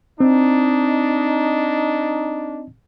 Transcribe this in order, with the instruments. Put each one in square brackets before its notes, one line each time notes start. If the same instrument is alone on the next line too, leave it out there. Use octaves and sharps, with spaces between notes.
[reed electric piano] C4 [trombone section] D4 D#4